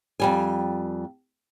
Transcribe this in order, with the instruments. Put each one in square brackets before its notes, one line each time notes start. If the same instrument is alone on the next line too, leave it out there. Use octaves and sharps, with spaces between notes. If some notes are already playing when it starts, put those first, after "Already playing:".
[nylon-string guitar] F2 G3 G#5